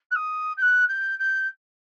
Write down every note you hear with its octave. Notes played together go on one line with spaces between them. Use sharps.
F#6
D#6
G6
F#6
G6
G6